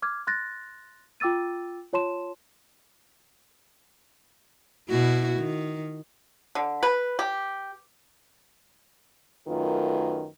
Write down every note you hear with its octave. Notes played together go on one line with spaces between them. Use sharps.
D6 F6 G#6
C6 F#6 A6 A#6
F4 G5 D6 E6 A6 D#7
F4 C#5 A5 C6 E7
B2 E4 F#4
D#3
D3
B4
G4
F#2 D#3 A3 F4 A#4 B4